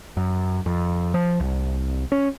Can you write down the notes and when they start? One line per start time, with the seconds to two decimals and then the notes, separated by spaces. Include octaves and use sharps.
0.17 F#2
0.66 F2
1.14 F3
1.40 C2
2.12 C#4